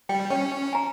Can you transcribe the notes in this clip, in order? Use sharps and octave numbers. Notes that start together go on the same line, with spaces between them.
G3 G5
C#4 C#5 G5
G#5 A#5